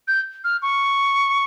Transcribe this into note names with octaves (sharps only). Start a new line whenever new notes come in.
G6
F6
C#6